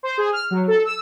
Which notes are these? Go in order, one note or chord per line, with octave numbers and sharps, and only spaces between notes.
C5
G#4
F6
F#3
A4
E6